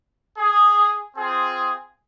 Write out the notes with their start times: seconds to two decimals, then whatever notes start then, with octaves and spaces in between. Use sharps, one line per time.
0.38 G#4
1.16 C4 F4 G#4